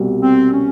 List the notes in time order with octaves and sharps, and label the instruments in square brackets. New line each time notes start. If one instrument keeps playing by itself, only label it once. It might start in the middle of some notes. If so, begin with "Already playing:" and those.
Already playing: [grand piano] C2 B2 G3
[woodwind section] C4
C#4